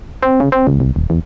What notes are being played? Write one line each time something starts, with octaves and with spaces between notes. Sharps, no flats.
C4
C#3
C4
C#2
C2
D#1
E2